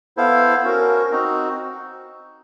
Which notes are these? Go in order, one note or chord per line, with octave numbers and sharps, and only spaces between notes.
B3 E4 A4 C5 F5
C#4 F#4 A#4
C4 D#4 F#4